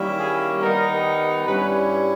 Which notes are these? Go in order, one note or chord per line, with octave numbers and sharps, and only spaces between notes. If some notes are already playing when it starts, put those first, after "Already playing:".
Already playing: D#3 G3 A#3 C#4 E4
G#4
D#3 G3 B3 D#4 A#4
G2 G3 C#4 E4 B4